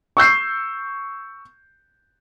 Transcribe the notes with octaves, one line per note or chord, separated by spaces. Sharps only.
C#6 E6 G6 C7